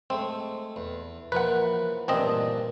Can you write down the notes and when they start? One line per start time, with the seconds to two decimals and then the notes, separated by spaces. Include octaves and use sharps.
0.10 G#3 A3 C4
0.76 E2
1.32 E3 F3 A#3 B4 F#5
2.08 A1 G2 A#2 C4 D4 D#5